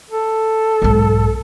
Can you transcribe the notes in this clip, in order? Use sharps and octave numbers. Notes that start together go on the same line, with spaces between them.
A4
B1 G#2